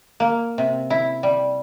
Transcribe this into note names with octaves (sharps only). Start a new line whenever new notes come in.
A#3
C3
E4
G3